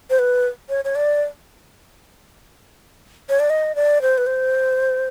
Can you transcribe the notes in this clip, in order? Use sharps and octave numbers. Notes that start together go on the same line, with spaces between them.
C5
B4
C#5
C#5
D5
C#5
D5
D#5
D5
C5
B4
C5